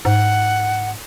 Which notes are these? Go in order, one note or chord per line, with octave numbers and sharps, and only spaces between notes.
G#2 F#5